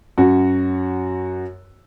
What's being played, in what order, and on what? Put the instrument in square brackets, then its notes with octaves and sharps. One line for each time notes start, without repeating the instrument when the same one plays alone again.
[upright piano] F#2 F#4